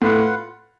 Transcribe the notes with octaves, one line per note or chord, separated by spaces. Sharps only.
A2 F4 B4 F#5